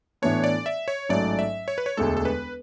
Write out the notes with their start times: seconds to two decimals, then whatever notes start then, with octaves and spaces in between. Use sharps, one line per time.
0.22 A2 E3 B3 D4 C#5
0.44 D5
0.66 E5
0.88 C#5
1.09 A1 G#2 F#3 A3 D5
1.39 E5
1.68 C#5
1.78 B4
1.86 C#5
1.97 E1 D2 D3 G#3 A4
2.17 A4
2.25 B4